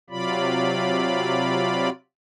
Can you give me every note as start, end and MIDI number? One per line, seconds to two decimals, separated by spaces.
0.10 1.90 48
0.10 1.90 54
0.10 1.90 65
0.10 1.90 74
0.10 1.90 83